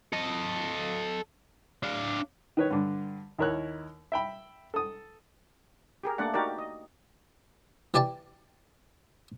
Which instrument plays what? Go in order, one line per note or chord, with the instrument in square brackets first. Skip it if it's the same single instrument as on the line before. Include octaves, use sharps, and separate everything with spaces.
[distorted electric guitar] A4 D#5
D4 F5
[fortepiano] D#3 B4 C#5
G2 D3
D#2 E4 A#4 C#5 F#6
E5 G5 B5
A4 D#6
[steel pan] G4 G#4 A#4
A3 A#3 D4 D5 F#5
D#4 F#4 G4 A#4 D5
D#5
[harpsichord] E3 G4 D5 G5 A5